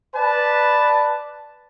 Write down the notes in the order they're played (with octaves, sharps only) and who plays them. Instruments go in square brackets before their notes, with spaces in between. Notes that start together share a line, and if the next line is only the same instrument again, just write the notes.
[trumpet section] B4 D5 A5